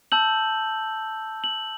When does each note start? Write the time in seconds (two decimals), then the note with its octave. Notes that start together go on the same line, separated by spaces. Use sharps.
0.12 A5 E6 G6 F#7
1.44 F#7